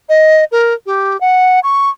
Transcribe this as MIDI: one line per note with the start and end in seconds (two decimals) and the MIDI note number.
0.09 0.44 75
0.52 0.74 70
0.86 1.19 67
1.21 1.60 78
1.63 1.90 85